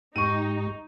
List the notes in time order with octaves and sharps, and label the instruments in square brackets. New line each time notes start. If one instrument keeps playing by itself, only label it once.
[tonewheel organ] G#2 G4 [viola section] D#4 [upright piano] C#6 D#7